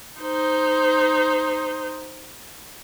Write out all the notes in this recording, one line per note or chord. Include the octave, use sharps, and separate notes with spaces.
D#4 C5